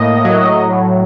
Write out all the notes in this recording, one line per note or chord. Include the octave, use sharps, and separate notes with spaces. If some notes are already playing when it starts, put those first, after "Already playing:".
Already playing: A2 A#3 D#5
F#3
A2